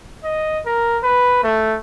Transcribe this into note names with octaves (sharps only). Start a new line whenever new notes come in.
D#5
A#4
B4
A3